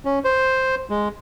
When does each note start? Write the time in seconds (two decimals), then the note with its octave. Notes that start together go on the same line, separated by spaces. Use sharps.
0.05 C#4
0.24 C5
0.90 G#3